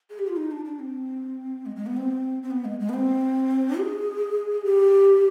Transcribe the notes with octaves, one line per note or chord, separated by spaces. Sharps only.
G#4
G4
F4
D#4
D4
D4
C4
G#3
G#3
B3
C4
C4
B3
G#3
G#3
B3
C4
G#4
G4